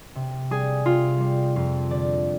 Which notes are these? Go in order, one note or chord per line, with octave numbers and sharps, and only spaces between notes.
C3
G3 G#4
C3 F4
G3
F2 F4
D3 D5